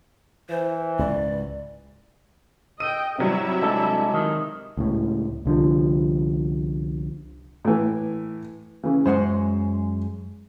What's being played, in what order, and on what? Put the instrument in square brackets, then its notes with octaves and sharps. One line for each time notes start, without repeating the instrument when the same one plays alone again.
[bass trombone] E3 [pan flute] C5
[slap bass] C#2 G#2 [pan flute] D5
[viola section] D#5 G5 [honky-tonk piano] E6 D#7
[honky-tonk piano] C3 F#3 G3 [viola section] E4 E5
[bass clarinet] G#3 [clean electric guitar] D4 A4
[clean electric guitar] D#3
[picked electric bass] C#2 A2
C2 D3 F3
[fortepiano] A2 E3
C#3 E3
[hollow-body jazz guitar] F#2 G#3 F#5 [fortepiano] C5